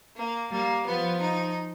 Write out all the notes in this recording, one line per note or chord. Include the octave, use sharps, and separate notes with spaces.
A#3
G3 A#3
F3 B3
D#4